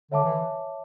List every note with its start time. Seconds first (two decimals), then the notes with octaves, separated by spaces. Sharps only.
0.11 D3 C#5 E5 A5 D6
0.24 E3